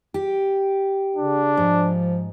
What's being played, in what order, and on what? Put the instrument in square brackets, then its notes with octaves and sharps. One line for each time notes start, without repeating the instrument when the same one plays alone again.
[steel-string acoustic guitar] G4
[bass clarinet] C#3 [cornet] D4
[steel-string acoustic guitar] G#2 [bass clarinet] F3